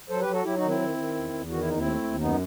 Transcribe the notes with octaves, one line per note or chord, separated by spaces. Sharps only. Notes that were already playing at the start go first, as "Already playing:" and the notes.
F#3 A4 C5
G4 B4
F#3
F#4 A4
F#3 E4 G4
D#4 F#4
D#3
C4 E4
D#3
D#3
E2
E2
D#3 F#4
E4
D#2 D#4
C4 E4
A3
D#2
F#2 B3 D#4